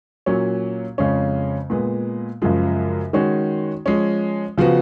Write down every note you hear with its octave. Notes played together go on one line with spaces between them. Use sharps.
A#2 F#3 C#4
F2 C#3 G#3 C#4
A#2 G#3 B3
F#2 C#3 F3 G#3
D#3 G#3 C#4 F#4
F3 G#3 C#4
C#3 F3 B3 F#4